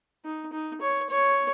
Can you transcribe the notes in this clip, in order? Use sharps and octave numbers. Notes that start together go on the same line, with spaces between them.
D#4
D#4
C#5
C#5